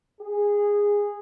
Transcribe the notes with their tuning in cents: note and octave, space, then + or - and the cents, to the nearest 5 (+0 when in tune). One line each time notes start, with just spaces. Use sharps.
G#4 -15